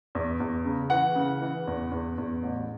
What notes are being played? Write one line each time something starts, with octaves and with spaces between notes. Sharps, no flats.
E2
E2
C#3
E3 F#5
C#3
E3
E2
E2
E2
A1